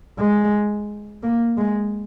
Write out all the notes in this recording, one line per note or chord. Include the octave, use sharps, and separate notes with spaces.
G#3
A#3
G#3